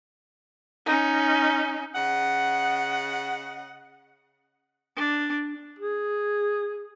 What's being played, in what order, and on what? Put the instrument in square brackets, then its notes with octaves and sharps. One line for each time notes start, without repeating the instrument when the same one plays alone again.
[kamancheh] C#4 D#4
[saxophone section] C#3 D#5 F#5
[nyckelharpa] D4
[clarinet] G#4